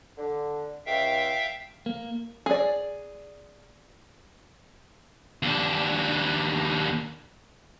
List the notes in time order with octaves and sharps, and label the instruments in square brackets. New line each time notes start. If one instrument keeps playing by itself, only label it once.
[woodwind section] D3
[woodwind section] C#2 [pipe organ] E5 F5 G5
[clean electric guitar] A#3
[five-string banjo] G#4 D5
[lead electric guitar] D#2 D4